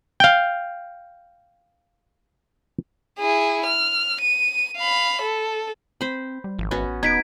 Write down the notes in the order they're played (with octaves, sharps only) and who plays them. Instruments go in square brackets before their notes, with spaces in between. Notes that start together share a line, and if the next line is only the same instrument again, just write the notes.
[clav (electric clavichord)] F5 G5
[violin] E4 G#4
F6
D#7
F5 B5
A4
[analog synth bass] C4 [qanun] C5 B5
[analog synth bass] G3
[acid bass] G#1 [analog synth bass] F3
[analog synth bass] A1 [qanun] B3 C#4 F#4
[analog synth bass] D#1 [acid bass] B3 [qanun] D#4 [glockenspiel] G#6 B6 D7